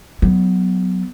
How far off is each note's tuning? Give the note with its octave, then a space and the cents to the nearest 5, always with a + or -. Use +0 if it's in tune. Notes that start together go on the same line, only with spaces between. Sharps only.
F#3 +0 B3 +10